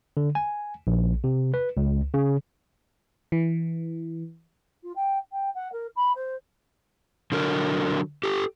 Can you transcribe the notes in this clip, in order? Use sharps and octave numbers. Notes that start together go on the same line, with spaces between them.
D3
G#5
A#1
C3
B4
C#2
C#3
E3
F4
G5
G5
F#5
A#4
B5
C5
D3 F#3 A#4
G4 A4